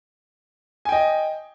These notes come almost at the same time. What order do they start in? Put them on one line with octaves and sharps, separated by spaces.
G#5 G5 D#5